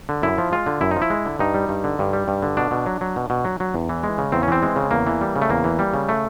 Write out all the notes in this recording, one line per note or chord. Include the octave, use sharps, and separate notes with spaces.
D3
F#2 E4
F3
G#3 F4
D3
F#2 E4
D#4
F3
E4
G#3
D3
G2 D#4
G3
G2
D3
G2
G3
G2
D3
B2 D4
B2
F#3
F#3
B2
B2
F#3
F#3
E2
E3
G#3
C#3
E2 C4
C#4
E3 C4
G#3
C#3
E2 A#3
E3
G3
C#3
A3
E2 A#3
E3
G3
C#3
A3